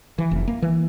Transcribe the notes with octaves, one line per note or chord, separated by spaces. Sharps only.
E3
F1
A#3
E3